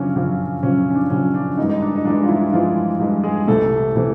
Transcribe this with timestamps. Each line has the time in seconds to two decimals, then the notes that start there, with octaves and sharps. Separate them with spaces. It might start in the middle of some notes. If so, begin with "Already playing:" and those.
Already playing: F#2 C#3 F3 C#4 D4
0.16 F#2 C#3 F3
0.63 F#2 C#3 F3 C#4
0.90 C#4
0.95 D4
1.10 F#2 C#3 F3 C#4
1.34 D4
1.57 G2 D#3 E3 G#3 D#4
1.69 D#3 D#4
1.82 D4
1.96 D#4
2.05 G2 E3 G#3 D4
2.23 F4
2.29 E3 E4
2.52 G2 E3 F3 G#3 F4
3.00 G2 E3 G#3
3.24 G#3 G#4
3.47 C2 C3 E3 A3 A4
3.96 C3 E3 A3